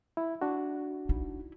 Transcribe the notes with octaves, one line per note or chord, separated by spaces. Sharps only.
E4
D4 F#4
D#4 E4